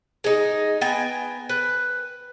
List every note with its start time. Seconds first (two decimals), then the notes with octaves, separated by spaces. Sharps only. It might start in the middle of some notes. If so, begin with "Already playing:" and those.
0.24 G#3 D#4
0.81 B3 G5 G#5 A#5
1.49 B4